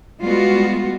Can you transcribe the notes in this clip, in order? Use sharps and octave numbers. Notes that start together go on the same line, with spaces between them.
G3 G#3 B3 F4 F#4